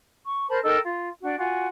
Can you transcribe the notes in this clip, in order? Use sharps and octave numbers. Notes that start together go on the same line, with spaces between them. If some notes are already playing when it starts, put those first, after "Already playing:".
C#6
A#4 C5 A5 B5
D#4 A4 A#4 G5
F4
D4 F#4
F4 F#4 G#5